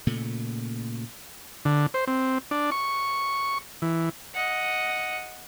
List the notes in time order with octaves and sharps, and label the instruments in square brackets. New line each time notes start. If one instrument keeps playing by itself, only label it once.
[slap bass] A#2 C#3 A3
[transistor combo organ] D3
C5
C4
D4
C#6
E3
[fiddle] D#5 F#5